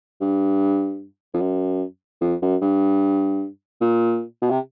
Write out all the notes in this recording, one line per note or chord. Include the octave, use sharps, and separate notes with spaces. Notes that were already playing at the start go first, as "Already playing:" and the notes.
G2
F2
F#2
F2
F#2
G2
A#2
B2
C3